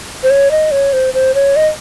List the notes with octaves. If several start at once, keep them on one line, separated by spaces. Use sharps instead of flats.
C5
C#5
D#5
C#5
C5
C5
C#5
D#5